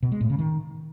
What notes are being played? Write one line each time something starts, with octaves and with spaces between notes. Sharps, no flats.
B2
G#3
A2
C#3
D#3